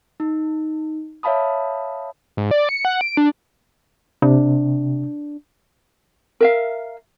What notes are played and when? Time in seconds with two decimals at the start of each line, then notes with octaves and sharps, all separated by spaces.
0.20 D#4
1.23 C#5 E5 F5 A5 B5 D#6
2.37 G#2
2.51 D5
2.69 C#7
2.85 F#5
3.01 D7
3.17 D4
4.22 C3 D4
6.40 A#4 E5 F5